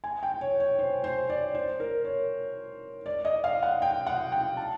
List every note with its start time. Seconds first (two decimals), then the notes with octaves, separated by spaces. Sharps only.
0.04 G#5
0.23 G5
0.41 C#5
0.60 C#5
0.79 C5
1.04 C5
1.29 D5
1.55 C5
1.80 A#4
2.04 C#5
3.06 D5
3.25 D#5
3.44 F5
3.63 F#5
3.82 G5
4.07 F#5
4.32 G5
4.57 A5